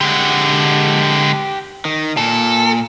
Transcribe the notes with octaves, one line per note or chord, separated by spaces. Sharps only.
D3 G#3 G4 F#5
D#3
A#2 A4